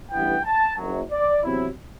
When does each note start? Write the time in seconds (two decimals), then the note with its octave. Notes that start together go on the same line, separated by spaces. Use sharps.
0.11 A1 G2 E3 B3 G5
0.45 A5
0.77 F#1 F#2 F#3
1.11 D5
1.43 E2 C3 F#3 C4 E4